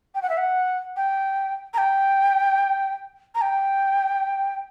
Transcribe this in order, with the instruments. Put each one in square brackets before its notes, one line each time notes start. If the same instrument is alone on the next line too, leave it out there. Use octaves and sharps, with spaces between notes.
[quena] G5
F#5
E5
F#5
G5
A#5
G5
A#5
G5